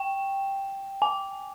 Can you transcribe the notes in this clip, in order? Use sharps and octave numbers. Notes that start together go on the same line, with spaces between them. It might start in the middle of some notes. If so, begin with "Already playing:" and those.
Already playing: G5
G#5